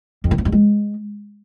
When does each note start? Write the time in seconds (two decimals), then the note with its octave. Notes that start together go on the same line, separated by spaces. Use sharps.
0.24 F2
0.31 D#3
0.38 F3
0.45 G2
0.52 G#3